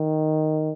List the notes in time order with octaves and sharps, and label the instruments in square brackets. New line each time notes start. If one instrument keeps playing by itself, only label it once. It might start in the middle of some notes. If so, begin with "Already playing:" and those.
Already playing: [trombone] D#3